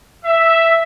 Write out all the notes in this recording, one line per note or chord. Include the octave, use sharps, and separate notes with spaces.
E5